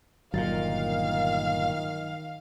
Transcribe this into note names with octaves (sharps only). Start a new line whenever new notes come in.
G1 A#2 D#3 F#3 F5 A6